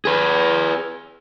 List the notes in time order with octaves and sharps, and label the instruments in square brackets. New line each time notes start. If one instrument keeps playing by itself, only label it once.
[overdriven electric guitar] G#4 B4